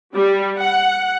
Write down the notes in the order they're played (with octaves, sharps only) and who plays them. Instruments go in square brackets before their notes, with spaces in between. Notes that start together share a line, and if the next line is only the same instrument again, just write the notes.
[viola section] G3
F#5